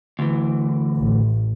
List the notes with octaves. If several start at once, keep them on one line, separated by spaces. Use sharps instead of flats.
D2 E3
A1